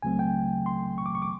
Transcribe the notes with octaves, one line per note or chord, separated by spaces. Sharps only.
C#2 C#3 F#3 A3 C4 G#5
G5
C6
C#6
D6
C#6
D6